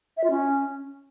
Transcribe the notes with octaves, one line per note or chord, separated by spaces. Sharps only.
E5
F4
C#4